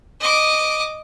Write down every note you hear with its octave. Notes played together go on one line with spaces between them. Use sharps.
D#5 D6